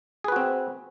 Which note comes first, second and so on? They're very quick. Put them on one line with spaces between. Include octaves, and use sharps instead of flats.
G#4 B4 F#4 C4